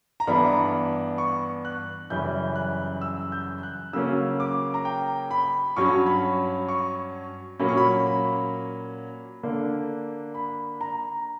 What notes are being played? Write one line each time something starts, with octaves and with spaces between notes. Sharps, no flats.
A#5
G2 E3 B3 D4 B5
C#6
F#6
F#2 C#3 E3 G3 C#4 G6
F#6
E6
G6
F#6
C#3 F#3 A#3 C#4 E6
D6
A#5
G5
B5
G2 F#3 C#4 C#6
B5
C#6
A#2 F#3 A#3 C#4 B5
C#6
B5
B5
D3 A#3 D4
B5
A#5